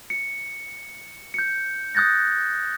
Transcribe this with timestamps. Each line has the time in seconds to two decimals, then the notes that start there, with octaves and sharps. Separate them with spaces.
0.10 C#7
1.34 G6 C#7
1.95 D#6 F#6 G6 A6 A#6